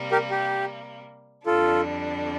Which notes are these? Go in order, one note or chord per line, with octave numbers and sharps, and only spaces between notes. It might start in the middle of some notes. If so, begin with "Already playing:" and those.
Already playing: C3 G3 A#3
G4 A#4
G4
F2 D3 G3 D4 F4 A4